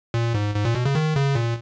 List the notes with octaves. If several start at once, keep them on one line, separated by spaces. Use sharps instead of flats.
A#2
G#2
G#2
A#2
B2
C#3
D#3
C#3
A#2